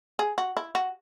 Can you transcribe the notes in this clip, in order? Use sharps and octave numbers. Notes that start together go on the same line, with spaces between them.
G#4
F#4
E4
F#4